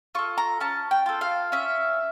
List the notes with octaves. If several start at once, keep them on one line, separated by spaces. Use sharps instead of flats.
F4 A4 C#6
A#5
C#4 A5
G5
F4 A4
F5
C#4 E5